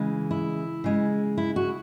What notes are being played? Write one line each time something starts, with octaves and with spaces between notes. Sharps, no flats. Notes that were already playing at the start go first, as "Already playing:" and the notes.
Already playing: C#3 E3 G#3
E4
C#3 G#3
E4
F#4